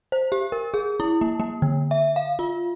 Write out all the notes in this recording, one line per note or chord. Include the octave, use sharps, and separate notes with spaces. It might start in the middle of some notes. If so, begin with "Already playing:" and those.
C5
G4
A#4
G#4
E4
A#3
A#3
D3
E5
F5
F4